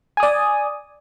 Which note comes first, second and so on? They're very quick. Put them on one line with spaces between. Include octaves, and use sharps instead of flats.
G#5 D#6 D5